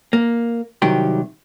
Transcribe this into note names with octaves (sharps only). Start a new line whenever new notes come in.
A#3
C2 D#3 F#3 G4